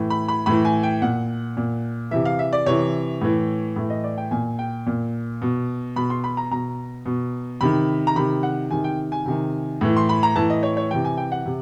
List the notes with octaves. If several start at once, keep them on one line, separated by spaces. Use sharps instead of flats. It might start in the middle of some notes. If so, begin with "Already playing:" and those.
Already playing: A2 E3
B5
B5
A2 E3 B5
G#5
G5
A#2 F#5
A#2
C3 E3 E5
F5
E5
D5
C3 E3 C#5
A2 E3
A2 E3
D#5
D5
G5
A#2 G#5
G5
A#2
B2
B2 B5
C6
B5
A#5
B2 A#5
B2
C3 D#3 B5
A#5
C3 D#3 B5
F#5
C3 D#3 G#5
G5
G#5
C3 D#3
A2 E3
C6
B5
A#5
A2 E3 A5
D#5
C#5
C#5
C3 E3 G5
G#5
G5
F#5
C3